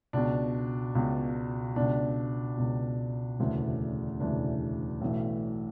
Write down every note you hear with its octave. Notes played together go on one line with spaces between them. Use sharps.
C#2 B2 D4
C#2 B2
C#2 B2 D4
C#2 B2
E1 D2 C#3 E3
E1 D2 C#3 E3 D4
B1 A2 E3